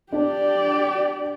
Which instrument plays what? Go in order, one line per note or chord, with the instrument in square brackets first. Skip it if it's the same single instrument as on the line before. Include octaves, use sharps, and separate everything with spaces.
[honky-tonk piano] D4 [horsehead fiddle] G4 D5